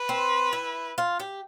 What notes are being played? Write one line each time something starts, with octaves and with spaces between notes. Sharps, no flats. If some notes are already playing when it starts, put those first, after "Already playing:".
Already playing: B4
C4
E4
F4
G4